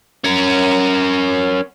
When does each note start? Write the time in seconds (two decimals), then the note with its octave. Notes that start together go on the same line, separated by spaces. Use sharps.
0.24 C#4 A#4